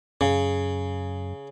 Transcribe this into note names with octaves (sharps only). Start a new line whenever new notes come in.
F#2 C#3